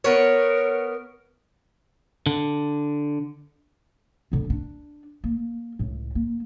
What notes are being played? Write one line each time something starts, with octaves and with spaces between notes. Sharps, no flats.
B3 A#4 C#5
D3
D1 D3
D4
A#3
C#2 A2
A#3